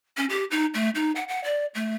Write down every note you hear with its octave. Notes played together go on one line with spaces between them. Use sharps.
C#4
G4
D#4
A3
D#4
F#5
F#5
D5
A3